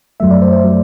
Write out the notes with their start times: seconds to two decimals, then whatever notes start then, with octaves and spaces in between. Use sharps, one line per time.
0.20 F#2 F#3 A3 E5
0.31 D5
0.42 C5
0.52 C5
0.64 F#3 A3